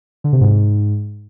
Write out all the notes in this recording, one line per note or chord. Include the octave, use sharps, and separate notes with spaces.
D3
C3
G#2